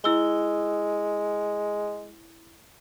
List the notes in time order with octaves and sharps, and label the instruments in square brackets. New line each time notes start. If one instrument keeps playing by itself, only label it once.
[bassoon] G#3 [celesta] E4 E6 G7